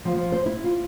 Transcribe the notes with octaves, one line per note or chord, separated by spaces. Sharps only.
F3
F3
C5
E4
F4